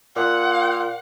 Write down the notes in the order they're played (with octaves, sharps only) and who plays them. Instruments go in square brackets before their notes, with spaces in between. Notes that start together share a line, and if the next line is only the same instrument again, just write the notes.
[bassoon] A#2 [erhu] F#5